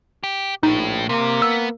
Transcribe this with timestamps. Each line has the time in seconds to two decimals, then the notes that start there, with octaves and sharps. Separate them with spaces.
0.24 G4
0.63 A#1 A2 D#4
1.09 C3 A#3
1.42 B3 E6